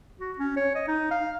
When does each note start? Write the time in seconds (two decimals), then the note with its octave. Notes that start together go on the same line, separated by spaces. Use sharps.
0.20 F#4
0.38 C#4
0.57 C#5
0.75 D#5
0.88 D#4
1.11 F5